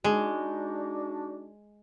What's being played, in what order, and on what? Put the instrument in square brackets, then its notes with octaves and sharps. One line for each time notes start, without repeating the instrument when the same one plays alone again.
[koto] G#3 [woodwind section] D4 D#4 F#4